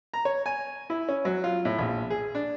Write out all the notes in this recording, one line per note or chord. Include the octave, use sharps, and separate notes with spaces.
A#5
C#5
G#5
E4
C#4
F#3
F4
A2
A#1
G#4
D4